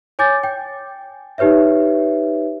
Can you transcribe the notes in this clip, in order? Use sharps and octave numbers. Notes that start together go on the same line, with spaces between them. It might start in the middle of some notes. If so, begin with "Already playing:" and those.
C#5 G#5 D6 G6 A6
G5
D#4 G4 B4 C#5 E5